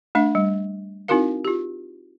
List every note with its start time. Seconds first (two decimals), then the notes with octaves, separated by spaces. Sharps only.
0.15 A3 D4 E5
0.35 G3
1.08 C4 D#4 E4 F#4 A#4 F5
1.45 F4 G4